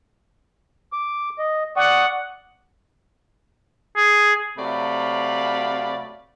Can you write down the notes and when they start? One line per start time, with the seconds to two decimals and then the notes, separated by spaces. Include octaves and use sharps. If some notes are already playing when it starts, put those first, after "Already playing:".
0.93 D6
1.39 D#5
1.76 D5 F#5 C#6 D#6
3.96 G#4
4.58 C3 F#3 A3 D5 F5 B5